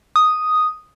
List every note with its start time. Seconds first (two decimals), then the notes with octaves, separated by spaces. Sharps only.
0.16 D#6